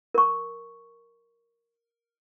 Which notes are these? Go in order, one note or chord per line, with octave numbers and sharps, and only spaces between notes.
A#4 C#6